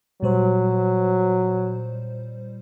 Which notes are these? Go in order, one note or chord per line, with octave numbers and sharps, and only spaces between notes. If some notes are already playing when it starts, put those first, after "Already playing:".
A#2 F#3 G3 C5